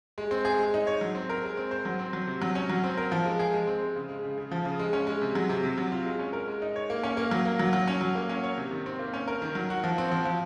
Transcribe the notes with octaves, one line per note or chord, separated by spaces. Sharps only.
G#3
C4
G#4
G#3
D#4
C#5
F#3
C4
A#4
G#3
C4
C5
F#3
C4
F#3
C3
F#3
C#4
F#3
C4
A#4
F3
G#3
G#4
G#3
C4
G#3
C#3
G#3
C#3
C#3
F3
C#3
G#3
C#4
G#3
C3
F#3
C3
C3
F#3
F4
G#3
C#4
A#4
G#3
D#4
C#5
A#3
C#4
A#3
F#3
A#3
F#3
F#3
C#4
F#3
A#3
C#4
C#5
C3
D#3
C4
A#3
C#4
A#4
D#3
F#3
F#4
F3
C4
F3
F3